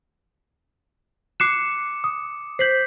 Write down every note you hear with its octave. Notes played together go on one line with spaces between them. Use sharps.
D6 F#6 C7 C#7 E7
D#6
C5 G6 B6 C7 F#7